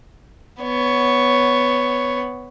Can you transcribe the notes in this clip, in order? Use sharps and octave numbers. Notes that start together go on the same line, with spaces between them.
B3 C#5